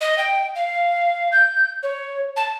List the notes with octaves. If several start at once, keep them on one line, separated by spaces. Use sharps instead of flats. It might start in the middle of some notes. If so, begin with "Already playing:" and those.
D#5
G5
F5
G6
C#5
A5